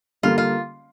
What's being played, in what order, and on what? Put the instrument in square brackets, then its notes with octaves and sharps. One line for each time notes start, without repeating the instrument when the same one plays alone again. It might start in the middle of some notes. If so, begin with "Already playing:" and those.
[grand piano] D3 G3 A#3 [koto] F4
[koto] F4